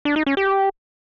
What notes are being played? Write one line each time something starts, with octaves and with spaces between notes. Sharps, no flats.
D4
D#4
C#4
G4